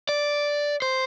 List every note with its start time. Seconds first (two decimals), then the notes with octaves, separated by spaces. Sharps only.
0.09 D5
0.82 C5